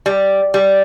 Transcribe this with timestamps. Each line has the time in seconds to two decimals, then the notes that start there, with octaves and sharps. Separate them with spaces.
0.06 G3
0.54 G3